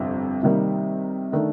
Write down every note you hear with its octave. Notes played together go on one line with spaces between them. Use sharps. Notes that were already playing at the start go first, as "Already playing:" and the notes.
Already playing: G1 F2 C3 G3
C3 D#3 G3 A#3 D#4
D#3 A3 D4